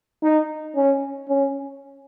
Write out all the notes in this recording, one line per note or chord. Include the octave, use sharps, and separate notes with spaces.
D#4
C#4
C#4